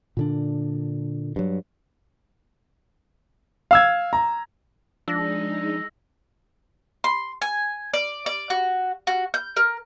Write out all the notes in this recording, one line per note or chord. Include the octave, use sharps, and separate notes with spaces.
A#2 D3 D4
G2 F#3
F5 E6 G#6
A#5
F3 G#3 D4 D#4 E6 A#6
C6
G#5
D5
D5
F#4
F#4
G6
A#4